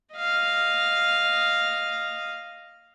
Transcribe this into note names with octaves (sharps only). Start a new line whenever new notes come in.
D#5 F5